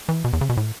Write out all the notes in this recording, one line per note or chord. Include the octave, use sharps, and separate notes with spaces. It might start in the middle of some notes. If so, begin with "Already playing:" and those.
E3
B2
E2
C#3
B2
A2